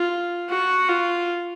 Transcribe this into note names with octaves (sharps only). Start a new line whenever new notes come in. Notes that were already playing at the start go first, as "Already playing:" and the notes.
Already playing: F4
F#4
F4